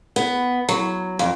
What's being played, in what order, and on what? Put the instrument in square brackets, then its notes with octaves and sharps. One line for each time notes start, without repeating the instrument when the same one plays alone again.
[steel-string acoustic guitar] B3
F#3
F2